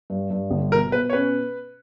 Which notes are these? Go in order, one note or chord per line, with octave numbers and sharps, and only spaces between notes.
G2
G2
G1
B2 A#4
B2 B4
C#5
C#4 B4